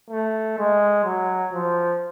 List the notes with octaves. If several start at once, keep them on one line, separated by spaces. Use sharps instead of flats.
A3
G#3
F#3
F3